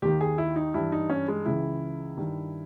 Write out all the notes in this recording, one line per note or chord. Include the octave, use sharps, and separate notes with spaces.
D#2 D#3 G4
G#4
E4
D#4
G2 E3 E4
D#4
C#4
G#3
C#2 C#3 E3 E4
G2 D#3